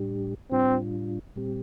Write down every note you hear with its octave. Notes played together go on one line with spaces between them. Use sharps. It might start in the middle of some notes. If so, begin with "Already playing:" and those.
Already playing: A2 G3 D4 G4
A2 G3 C4 D4 F4
A#2 G3 C4 G4